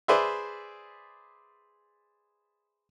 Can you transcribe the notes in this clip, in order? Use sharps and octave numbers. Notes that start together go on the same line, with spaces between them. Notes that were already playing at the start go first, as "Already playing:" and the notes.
G#4 B4 C5 D5 E5